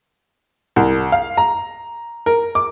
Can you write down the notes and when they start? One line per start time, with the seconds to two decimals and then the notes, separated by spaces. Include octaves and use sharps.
0.76 C2
1.12 F5
1.37 A#5
2.26 A#4
2.55 D6